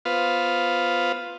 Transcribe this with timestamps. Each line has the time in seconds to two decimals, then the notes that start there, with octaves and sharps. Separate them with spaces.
0.05 B3 F4 B4 C5 F5